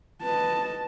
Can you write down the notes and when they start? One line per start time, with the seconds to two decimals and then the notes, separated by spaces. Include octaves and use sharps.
0.23 B4 D#5 A5